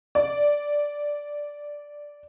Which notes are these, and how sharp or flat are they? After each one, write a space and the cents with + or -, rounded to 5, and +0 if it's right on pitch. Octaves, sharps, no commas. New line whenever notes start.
D5 +0